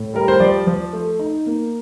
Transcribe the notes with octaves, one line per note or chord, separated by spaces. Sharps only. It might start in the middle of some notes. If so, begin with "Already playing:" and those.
Already playing: A2
G3 A#4
C5
F3 D5
F3
A3
D#4
A#3